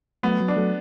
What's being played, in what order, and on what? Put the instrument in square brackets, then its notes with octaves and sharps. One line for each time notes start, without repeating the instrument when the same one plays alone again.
[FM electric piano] F#3 A3 [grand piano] B3
[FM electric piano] F#3
[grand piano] D4
[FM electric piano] F#3 A3